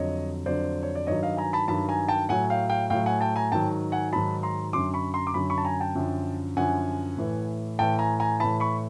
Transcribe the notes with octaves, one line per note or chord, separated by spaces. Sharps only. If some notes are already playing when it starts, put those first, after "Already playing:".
Already playing: F2 D3 F#3 C#5 D#5
F2 D3 F#3 C5 D5
C#5
D5
G2 D#3 F#3 C#5 D#5
D#5 F5
G#5 A#5
A5 B5
G2 D#3 F#3 A5 B5
G#5 A#5
G5 A5
A2 F#3 F#5 G#5
F5 G5
F5 G5
A2 F#3 F5 G5
F#5 G#5
G5 A5
G#5 A#5
G#2 D#3 F#3 G5 A5
F#5 G#5
G#2 D#3 F#3 A5 B5
A#5 C6
F#2 D3 F#3 C6 D6
B5 C#6
A#5 C6
D6
F#2 D3 F#3 B5 C#6
B5 C#6
A5
G#5 A#5
G5 A5
F#2 D3 F3
F#2 D3 F3 F#5 G#5
A2 E3
A2 E3 G5 A5
G#5 A#5
G#5 A#5
A2 E3 A5 B5
B5 C#6